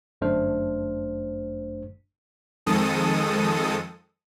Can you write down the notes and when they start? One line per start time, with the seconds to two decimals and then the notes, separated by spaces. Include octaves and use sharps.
0.21 G1 F#2 A3 D4 C5 F6
2.66 F2 D#3 G#3 A4 D#6